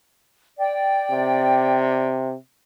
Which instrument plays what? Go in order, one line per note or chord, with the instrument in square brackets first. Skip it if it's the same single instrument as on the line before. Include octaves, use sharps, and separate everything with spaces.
[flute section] D5 G5
[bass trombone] C3